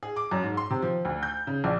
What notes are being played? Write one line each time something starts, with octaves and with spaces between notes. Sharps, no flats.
G#4
D6
F#2
G#2
C6
C3
F3
D2
G6
C#3
A#1